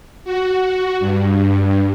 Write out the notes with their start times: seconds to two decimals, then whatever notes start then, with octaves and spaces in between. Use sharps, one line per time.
0.24 F#4
1.00 G2